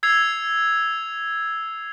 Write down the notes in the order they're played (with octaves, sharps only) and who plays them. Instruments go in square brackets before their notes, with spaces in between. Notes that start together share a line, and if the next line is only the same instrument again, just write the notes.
[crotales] E6 G#6 C7 F7